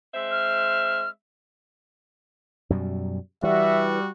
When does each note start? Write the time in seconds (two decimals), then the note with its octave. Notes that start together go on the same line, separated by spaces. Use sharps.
0.14 G#3 C4 E5
0.31 F6
2.70 F#2 B2 G3
3.43 E3 G3 F#4 E5